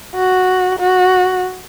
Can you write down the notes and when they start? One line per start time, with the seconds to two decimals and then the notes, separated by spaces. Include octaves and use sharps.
0.15 F#4
0.79 F#4